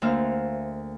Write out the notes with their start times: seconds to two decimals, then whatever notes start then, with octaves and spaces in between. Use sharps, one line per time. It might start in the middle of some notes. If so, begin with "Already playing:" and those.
0.02 D2 A#3 C5 E5 F5 F6